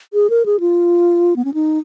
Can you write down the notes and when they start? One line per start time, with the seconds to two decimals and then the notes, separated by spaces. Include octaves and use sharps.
0.13 G#4
0.30 A#4
0.46 G#4
0.60 F4
1.36 B3
1.45 C#4
1.54 D#4